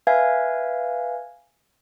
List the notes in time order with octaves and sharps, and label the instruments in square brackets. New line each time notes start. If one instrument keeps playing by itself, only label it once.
[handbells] B4 E5 F5 G#5 G#6